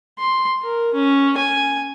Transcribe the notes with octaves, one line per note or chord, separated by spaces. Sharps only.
C6
A#4
C#4
G#5